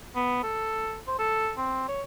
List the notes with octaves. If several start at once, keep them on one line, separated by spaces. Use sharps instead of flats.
B3
A4
C5
A4
C4
C#5